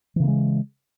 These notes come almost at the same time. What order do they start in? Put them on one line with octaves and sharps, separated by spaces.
E3 C#3 A#3 G#3